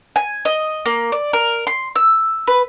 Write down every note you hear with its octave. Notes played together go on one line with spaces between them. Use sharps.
G#5
D#5
A#3
D5
A#4
C6
E6
B4